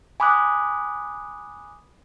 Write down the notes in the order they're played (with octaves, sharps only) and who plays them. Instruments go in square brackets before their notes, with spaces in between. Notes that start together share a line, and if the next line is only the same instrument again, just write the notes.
[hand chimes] G#5 B5 D6 D#6 F#6